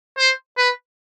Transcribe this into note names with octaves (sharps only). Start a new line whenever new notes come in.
C5
B4